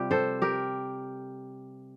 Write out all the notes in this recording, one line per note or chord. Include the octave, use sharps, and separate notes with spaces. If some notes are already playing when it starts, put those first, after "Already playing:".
Already playing: C3 G3 F4 G4
A4 C5
G4 A#4